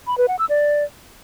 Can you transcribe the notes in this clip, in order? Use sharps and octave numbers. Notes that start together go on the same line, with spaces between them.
B5
B4
F#5
E6
D5